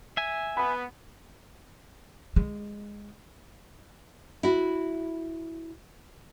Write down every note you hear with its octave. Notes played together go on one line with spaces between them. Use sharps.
E5 G#5
B3 B5
G#3
E4 F#4